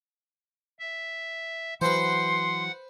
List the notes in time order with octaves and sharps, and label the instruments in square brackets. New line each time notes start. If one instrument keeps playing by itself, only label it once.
[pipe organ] E5
[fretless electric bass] E3 F#3 [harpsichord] B4 C5 [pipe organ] F#5 [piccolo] C6